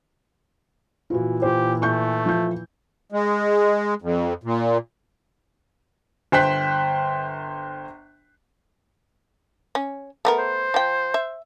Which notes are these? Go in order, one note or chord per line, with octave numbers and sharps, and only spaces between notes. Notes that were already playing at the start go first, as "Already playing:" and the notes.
A#2 E3 F4 F#4
F4 G4 C5
A3 C#6 G6
F3 G6
G#3
F2
A#2
G1 C5 G5 C6 F#6 B6
C#4
A3 B3 A#4
C5
F3 G5
E5